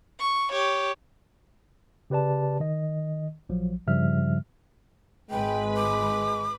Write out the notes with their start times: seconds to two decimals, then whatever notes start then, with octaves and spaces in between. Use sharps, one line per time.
0.19 C#6
0.52 G4 C#5
2.10 C#3 G4 B4 D5 A5
2.60 D#3 D#5
3.49 A#1 F3 F#3
3.87 G2 C#3 F3 G3 E5 F6
5.30 G#1 G#3 B4 G5 B5
5.77 D6